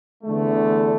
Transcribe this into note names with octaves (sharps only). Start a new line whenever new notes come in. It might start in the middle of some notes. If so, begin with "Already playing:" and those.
E2 D3 A3